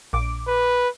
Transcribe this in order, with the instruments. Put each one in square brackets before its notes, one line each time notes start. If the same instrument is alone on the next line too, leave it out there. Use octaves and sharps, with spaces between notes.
[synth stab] A#1 D6
[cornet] B4